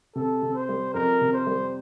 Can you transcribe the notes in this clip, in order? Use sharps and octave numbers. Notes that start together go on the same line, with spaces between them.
C3 A4
C3
C5
G3
F2 A#4
C3
C5
G3